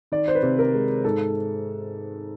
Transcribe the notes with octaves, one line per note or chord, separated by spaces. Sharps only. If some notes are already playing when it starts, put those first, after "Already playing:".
D#3 D5
C5
B4
C3
A#4
G#3
G#2 A4